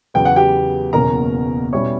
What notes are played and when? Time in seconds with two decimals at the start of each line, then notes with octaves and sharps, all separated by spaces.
0.14 E2 C#3 F#3 B3 G5
0.25 F#5
0.36 G4 G5
0.93 F#1 E2 B2 A#3 C#4 A#4 A#5
1.73 B2 G3 C#4 E4 C#5 C#6